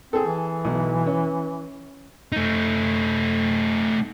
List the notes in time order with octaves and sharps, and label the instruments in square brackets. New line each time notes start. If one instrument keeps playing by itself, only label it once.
[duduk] C4 [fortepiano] G#4 A4
[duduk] E3
[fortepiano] B1
C#4
[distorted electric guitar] A3 D#4